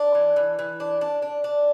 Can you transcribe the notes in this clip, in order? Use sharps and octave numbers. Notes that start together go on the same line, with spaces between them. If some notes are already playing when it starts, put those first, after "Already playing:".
Already playing: D4
E3
E3
E3
D4
D4
D4
D4